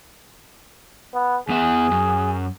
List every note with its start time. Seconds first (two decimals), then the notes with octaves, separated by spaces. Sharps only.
1.14 B3
1.49 E2 B3 G#4 E5
1.91 F#2